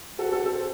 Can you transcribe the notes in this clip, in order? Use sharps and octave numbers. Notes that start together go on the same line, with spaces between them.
F#4 A4
F#4 A4
A4 C5